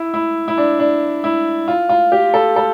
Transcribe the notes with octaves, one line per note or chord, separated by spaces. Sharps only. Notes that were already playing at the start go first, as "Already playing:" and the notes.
Already playing: E4
E4
E4
D4
D4
E4
F4
F4
G4
A4
A4